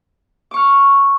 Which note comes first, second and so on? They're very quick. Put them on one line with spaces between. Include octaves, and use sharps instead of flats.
D6 C#6 F6